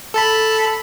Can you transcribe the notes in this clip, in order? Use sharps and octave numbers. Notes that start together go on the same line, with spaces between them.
A4 A5 B5